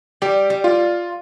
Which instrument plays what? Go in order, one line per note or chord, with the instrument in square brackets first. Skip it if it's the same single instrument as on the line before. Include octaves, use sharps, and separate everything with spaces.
[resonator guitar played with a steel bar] G3 [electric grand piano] G4
[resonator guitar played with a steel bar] G3
[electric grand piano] F4